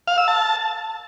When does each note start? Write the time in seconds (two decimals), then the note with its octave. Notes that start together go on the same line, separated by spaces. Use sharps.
0.08 F5
0.18 E6
0.28 A5